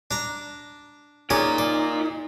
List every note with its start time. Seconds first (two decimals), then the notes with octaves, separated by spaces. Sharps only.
0.11 D4 A#5
1.30 C#4 D#4 F4 G#4 A#4 D5
1.58 D5